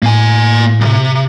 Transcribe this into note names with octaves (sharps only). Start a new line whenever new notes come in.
A2 A#3 G#5
B1 C3